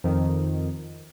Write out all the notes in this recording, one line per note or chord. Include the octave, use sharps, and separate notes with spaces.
F2 D#3